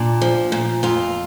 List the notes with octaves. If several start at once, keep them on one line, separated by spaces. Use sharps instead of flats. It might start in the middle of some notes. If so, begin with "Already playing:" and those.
Already playing: A#2 D4
F3
A#2
F2 F4